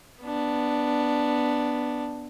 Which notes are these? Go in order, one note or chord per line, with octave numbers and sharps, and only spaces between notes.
B3 D4